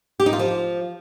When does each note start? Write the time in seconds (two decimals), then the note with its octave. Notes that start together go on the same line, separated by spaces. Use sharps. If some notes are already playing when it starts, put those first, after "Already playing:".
0.20 G4
0.26 D#4
0.33 F4
0.39 F3